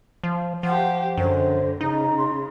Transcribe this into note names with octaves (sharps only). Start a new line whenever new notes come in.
F3
F3 G4 C5 F#5
F#2 D3 C5
C#3 D#4 A#5
C6